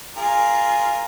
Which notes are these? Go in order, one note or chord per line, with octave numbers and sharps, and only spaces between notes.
F4 G#4 A#4